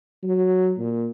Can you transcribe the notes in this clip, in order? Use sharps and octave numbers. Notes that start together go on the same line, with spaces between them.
F#3
A#2